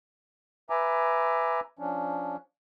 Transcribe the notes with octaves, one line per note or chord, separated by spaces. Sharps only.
B4 E5 G#5 A#5 D6
F3 C#4 D4